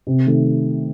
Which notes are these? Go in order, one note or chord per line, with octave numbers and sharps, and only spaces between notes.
C3
D#3 A3